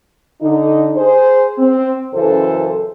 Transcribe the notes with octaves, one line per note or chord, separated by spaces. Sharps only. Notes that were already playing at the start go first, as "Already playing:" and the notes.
D3 D#4
G#4 C5
C4
F#2 C#3 E3 A4 C5